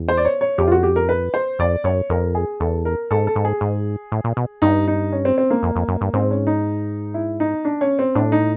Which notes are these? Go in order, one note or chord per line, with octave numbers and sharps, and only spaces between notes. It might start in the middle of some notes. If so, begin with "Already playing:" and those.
Already playing: E2
C5
D5
C#5
C#5
F2 G4
F4
F#4
G4
A#4
B4
C5
F2 D5
F#2 C#5
F2 A#4
G#4
E2 A4
A#4
G#2 A4
A4
G#2
G#4
G#2
A2
A#2
B2
G2 D#4
D#4
C#4
C4
C4
A#3
F2
F2
F#2
G2
G#2 C4
C#4
D#4
E4
D#4
D4
C#4
C4
A2 D4
D#4